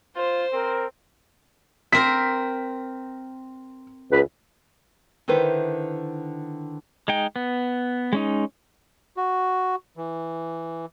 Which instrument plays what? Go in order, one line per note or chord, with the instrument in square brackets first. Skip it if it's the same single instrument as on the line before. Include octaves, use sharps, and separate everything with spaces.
[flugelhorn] F4 [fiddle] C5
[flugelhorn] C4 [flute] A#4
[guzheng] C4 A#4 C5 [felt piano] B6
[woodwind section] C#2 B4
[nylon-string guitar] D3 D#3 E4 B4 C5
[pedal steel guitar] G#3 D#4 G5
B3
G#3 C#4 D#4
[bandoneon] F#4
E3